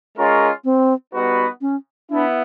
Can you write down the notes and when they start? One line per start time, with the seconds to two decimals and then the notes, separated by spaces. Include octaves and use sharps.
0.16 G#3 C#4 F4 A#4 C#5
0.65 C4
1.13 G3 B3 D#4 F#4 B4
1.61 C#4
2.10 B3 D4 E4